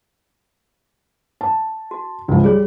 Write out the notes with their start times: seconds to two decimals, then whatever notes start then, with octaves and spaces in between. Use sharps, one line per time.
1.41 A5
1.91 F#4
2.28 C#2 F3
2.44 G3 G#4 C#5